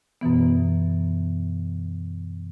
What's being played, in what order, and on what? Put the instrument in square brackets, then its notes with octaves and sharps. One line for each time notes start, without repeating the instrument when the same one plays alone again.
[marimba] F#2 B2 E3 B3